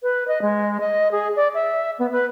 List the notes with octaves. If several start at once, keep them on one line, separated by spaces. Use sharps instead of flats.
B4
D#5
G#3
D#5
G#4
D5
E5
B3
B4